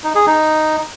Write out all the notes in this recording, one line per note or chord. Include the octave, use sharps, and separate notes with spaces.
D#4
G#4
D#4